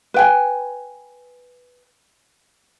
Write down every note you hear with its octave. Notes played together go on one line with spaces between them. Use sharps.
B4 G5 G#5